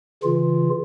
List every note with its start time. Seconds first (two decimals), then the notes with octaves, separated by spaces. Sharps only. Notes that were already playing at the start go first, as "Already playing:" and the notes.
0.23 C#3 E3 F4